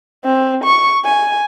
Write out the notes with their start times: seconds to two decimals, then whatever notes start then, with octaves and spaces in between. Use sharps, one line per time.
0.25 C4
0.64 C#6
1.05 G#5